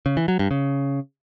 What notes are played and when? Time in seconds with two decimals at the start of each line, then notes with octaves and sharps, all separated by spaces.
0.06 C#3
0.17 E3
0.28 F#3
0.39 G2
0.51 C#3